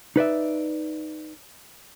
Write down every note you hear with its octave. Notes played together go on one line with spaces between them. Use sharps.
D#4 B4 D5 E5